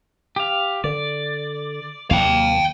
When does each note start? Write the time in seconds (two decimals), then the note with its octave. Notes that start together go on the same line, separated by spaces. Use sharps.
0.36 G4 F5
0.84 D3 D5
2.11 D#2 C3 F#3 A#3 F5 G5